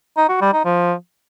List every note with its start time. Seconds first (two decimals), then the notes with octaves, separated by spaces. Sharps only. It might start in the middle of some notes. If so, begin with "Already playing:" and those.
0.17 D#4
0.29 F#4
0.41 G3
0.53 D#4
0.65 F3